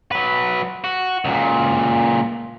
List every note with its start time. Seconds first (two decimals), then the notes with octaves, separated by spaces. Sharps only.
0.12 F#3 B4
0.84 F#4
1.25 C#2 A#2